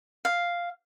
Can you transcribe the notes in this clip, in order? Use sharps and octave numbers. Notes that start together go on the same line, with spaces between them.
F5